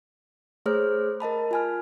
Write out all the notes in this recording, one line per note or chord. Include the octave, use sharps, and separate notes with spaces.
A3 G#4 C5 C#5 F6
A#4 D#5 A5 B5
F4 G#5 F6